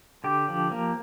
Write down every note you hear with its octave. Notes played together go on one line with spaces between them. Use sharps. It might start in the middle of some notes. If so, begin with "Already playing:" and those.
D3 G4
F3
A#3